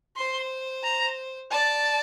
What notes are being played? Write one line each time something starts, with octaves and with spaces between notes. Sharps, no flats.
C5 C6
A#5
D5 A5